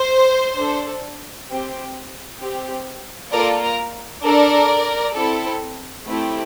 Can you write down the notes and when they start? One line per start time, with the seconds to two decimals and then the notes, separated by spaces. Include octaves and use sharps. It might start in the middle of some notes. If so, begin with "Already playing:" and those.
Already playing: C5
0.57 D4 A4
1.49 C4 G4
2.40 C4 G4
3.32 A#3 F4 A4 A#4 D5
3.62 A#4
4.23 D4 A4 A#4 D5
5.15 C4 E4 A4
6.07 A3 C4 E4 G4